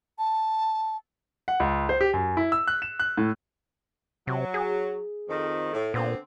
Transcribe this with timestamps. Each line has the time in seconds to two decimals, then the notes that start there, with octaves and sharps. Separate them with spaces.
0.19 A5
1.48 F#5
1.60 C#2
1.89 C5
2.01 G4
2.13 F#2
2.37 E4
2.52 E6
2.68 F#6
2.82 E7
3.00 F#6
3.18 A2
4.27 C3 F#3
4.54 G#4
5.28 F2 D#3
5.73 A2
5.94 A#2 D3 B3 C4